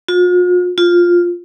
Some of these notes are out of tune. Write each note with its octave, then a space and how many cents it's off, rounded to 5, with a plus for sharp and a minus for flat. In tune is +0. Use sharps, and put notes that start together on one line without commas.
F4 +45
F4 +5